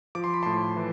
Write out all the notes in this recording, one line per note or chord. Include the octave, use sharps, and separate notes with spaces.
F3 D6
C6
B5
A2 A5 C6
E3